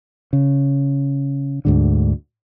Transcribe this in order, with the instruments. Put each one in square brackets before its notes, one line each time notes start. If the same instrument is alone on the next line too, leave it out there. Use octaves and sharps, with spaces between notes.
[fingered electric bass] C#3
D2 G#2 D3